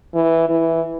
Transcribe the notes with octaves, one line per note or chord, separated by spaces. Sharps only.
E3
E3